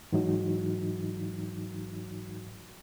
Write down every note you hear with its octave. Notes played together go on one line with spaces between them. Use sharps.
G#2 E3 F#3 D#4 F#4